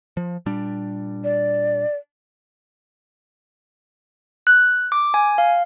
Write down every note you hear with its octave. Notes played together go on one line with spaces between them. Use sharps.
F3
A#2 G3 D4
D5
F#6
D6
G#5
F5